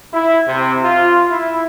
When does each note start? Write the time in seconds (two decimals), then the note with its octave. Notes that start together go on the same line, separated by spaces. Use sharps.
0.14 E4
0.48 C3
0.83 F4
1.31 E4